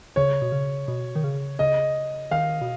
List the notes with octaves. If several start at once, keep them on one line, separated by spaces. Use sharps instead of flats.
C#3 C#5
B2
C#3
B2
D#3
C#3
C#3 D#5
D#3 F5
B2